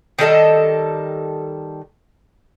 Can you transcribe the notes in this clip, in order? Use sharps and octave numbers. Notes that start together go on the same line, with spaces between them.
D#3 G3 A4 D#5